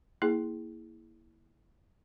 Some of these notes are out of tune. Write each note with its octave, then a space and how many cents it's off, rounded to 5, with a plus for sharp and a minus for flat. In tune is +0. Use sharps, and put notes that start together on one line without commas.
A#3 +0 E4 -10 G#4 +0